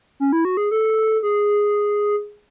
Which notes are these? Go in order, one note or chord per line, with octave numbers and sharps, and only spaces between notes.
C#4
E4
F#4
G#4
A4
G#4